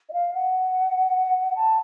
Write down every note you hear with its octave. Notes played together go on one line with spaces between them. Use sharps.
D#5
F5
F#5
A5